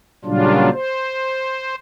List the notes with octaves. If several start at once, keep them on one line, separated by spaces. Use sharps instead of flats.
A#2 C#3 F#3 G3 D4 F4
C5